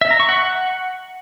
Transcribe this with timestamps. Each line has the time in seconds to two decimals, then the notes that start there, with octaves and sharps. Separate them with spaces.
0.01 E5
0.11 A#5
0.20 C#6
0.29 F#5